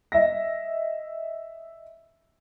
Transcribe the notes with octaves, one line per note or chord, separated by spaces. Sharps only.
D#5 E5 A#6